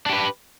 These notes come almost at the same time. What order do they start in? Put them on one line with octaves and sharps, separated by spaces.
D4 G4 B4